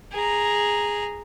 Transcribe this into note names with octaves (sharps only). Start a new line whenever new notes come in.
G#4 A#5